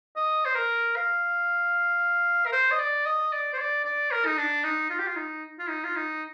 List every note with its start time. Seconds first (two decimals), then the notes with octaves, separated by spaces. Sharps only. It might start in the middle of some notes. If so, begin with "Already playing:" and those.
0.16 D#5
0.45 C5
0.55 A#4
0.96 F5
2.46 A#4
2.52 C5
2.71 D#5
2.79 D5
3.06 D#5
3.33 D5
3.53 C5
3.59 D5
3.84 D5
4.11 A#4
4.25 D#4
4.37 D4
4.64 D#4
4.90 F4
4.99 G4
5.07 F4
5.16 D#4
5.59 F4
5.69 D#4
5.84 F4
5.96 D#4